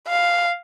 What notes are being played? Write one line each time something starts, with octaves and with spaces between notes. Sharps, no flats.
F5